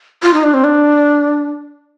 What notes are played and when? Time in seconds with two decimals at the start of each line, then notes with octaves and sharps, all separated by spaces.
0.23 F4
0.34 D#4
0.43 D4
0.54 C4
0.64 D4